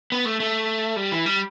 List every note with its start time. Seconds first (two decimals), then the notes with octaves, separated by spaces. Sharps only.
0.12 B3
0.25 A3
0.40 A3
0.96 G3
1.12 E3
1.26 G3